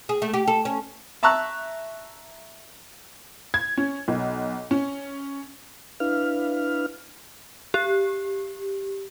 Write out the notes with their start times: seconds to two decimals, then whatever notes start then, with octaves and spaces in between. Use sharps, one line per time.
0.09 G#4
0.22 A3
0.34 G4
0.48 A4
0.65 C#4
1.23 E5 A5 A#5 C#6 E6 F#6
3.54 G#6
3.78 C#4
4.08 B1
4.71 C#4
6.00 D4 E4 B4 F5 F6
7.74 G4